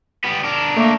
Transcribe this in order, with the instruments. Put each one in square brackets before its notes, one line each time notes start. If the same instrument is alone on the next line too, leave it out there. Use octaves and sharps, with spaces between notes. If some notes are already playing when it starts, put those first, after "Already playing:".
[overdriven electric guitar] G3 B3
D4 A#4
[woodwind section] A3 A#3